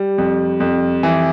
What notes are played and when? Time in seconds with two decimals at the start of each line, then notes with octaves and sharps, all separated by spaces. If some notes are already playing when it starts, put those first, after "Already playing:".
Already playing: G3
0.18 F2
0.60 F2
1.03 E3